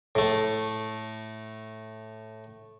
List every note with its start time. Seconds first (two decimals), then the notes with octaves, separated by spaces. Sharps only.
0.15 A2 A3